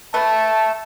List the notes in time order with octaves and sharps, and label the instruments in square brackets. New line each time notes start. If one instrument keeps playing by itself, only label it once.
[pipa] A3 B4 [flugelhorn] A5